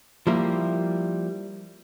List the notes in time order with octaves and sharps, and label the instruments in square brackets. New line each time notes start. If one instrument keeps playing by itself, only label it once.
[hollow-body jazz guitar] F3 G3 A#3 E4 A#4